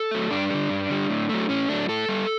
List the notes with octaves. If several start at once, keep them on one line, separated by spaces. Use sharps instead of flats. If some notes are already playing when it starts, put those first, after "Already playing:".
Already playing: A4
F#3 A3
G2 D4
D3 G3
G2
D3 G3
A2
F#3 A3
A2 C#4
F#3 A3 D4
A2 A4
G3